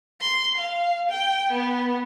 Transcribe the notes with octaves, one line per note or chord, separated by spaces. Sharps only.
C6
F5
G5
B3